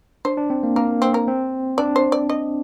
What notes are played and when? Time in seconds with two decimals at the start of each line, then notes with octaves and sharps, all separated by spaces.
0.25 D4 C5
0.37 D4
0.50 C4
0.63 A#3
0.76 A#3 A#4
1.02 C4
1.14 A#4
1.28 C4
1.78 D4 D5
1.96 C5
2.12 D5
2.29 D#5